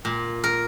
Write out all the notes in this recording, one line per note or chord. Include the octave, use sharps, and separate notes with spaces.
A#2
A#4